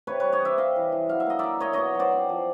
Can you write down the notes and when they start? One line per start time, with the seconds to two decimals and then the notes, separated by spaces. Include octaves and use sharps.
0.07 C3 B4 C#5
0.20 G3 B4 C#5
0.32 C#5 D#5
0.41 C3 D5 E5
0.58 G3 D#5 F5
0.76 E3
0.92 E3
1.09 F#3 F5
1.20 E5
1.26 A#3 D#5
1.39 D#4 D5 E5
1.60 A#3 C#5 D#5
1.73 B2 C#5 D#5
1.95 F#3 C5 D5
2.12 C4
2.29 F3